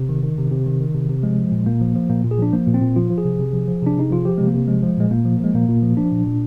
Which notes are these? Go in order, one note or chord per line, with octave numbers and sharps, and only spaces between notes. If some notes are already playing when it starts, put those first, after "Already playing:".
Already playing: C3
D#3
D#3
C3
C3
D#3
D#3
C3
C3
F3 G#3
F3
A#2
A#2 A#3
F3
F3
A#2 A#3
A#2
G#4
F3 D4
F3 A#3
A#2
C4
A#2
F3 F4
F3
G#4
C3
C3
F3
F3
C3 D4
C3 D#4
F3 F4
F3 G4
C3 G#3
A#3
C3
F3 G#3
F3
A#2 G#3
A#2 A#3
F3
F3 G#3
A#2 A#3
A#2
F3
F3 D4
A#2
A#2